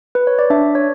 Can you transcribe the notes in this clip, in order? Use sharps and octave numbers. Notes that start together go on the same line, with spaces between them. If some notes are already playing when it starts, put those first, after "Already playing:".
B4
C#5
D5
D4 E5
C#5